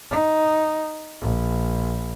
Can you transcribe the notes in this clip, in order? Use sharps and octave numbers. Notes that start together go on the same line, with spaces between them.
D#4
A#1